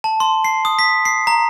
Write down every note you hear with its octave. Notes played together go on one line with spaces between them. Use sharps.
A5
C6
C7
D#6
B6
C7
A#5